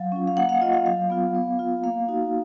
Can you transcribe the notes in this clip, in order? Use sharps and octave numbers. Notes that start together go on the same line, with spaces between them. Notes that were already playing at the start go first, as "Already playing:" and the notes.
Already playing: F#3 F5
C#4 F4
F5
A#3 F#5
F5
F4 D#5
F5
F#3 F5
B3 F4
B3
F4
A#3 F5
D#4 F#4